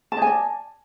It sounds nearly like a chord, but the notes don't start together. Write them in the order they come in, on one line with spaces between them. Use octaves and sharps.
A5 D#5 G#5 D5